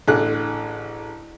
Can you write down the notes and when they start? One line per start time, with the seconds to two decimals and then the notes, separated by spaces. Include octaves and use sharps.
0.08 A1 D3 G#4 F#6